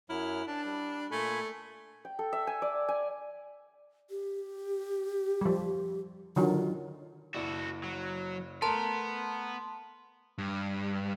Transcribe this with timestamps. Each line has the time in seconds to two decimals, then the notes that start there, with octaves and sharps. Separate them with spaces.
0.10 F#2 F#3 E4 F6
0.47 D4 A5
0.65 G3
1.11 A#2 A3 G#5 B5
2.05 G5
2.19 A4
2.33 E5
2.47 G#5
2.62 D5
2.88 G#5
4.10 G4
5.41 F3 G3
6.36 D3 D#3 F#3 F4
7.34 F#1 E4 F#4 A4 D5
7.84 F#3
8.62 A3 B3 A#4 A5 C6
10.38 G2